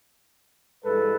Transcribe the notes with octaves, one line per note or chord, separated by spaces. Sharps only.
G2 E3 G#3 A4 B4